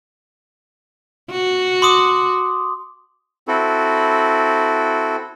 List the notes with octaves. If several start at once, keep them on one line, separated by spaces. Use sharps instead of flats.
F#4
C6 D6 D#6
C4 E4 F#4 A4